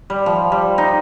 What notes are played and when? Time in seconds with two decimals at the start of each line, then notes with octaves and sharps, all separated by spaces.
0.10 G3
0.26 F3
0.52 G3
0.78 D#4